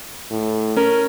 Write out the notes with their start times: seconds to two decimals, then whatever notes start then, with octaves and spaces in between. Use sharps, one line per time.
0.31 A2
0.77 C#4 A#4